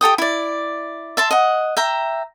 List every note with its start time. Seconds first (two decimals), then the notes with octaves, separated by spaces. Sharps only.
0.01 G4 A4 G5 D#6
0.18 E4 D5
1.17 E5 A5 C6
1.31 D#5 F#5
1.77 E5 G5 A#5